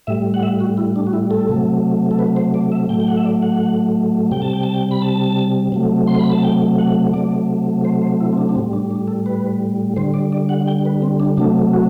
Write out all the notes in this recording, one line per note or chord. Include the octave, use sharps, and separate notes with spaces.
A2 G3 E5
F#5
E5
F#4
E4
D4
F#4
E4
A4
C3 F#3 A3
A4
B4
C5
D5
E5
A2 F#3 A3 G5
G5
F#5
E5
D5
F#5
C3 G3 G5
A5
G5
A5
G5
B5
A5
C3 F#3 A3
C6
B5
A5
G5
F#5
C3 F#3 A3 D5
C5
C5
E4
C4
D4
D4
A2 G3 C4
D4
D4
A4
B4
D3 G3 C5
D5
D5
F#5
G5
B4
C4
D4
C3 F#3 A3 D4
F#4